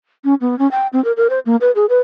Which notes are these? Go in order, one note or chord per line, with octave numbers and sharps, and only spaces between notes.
C#4
B3
C#4
G5
C4
A#4
A#4
C5
A#3
B4
G#4
B4